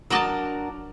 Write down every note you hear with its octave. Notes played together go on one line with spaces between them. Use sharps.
F#3 D4 F#4 A#4 D#5 A5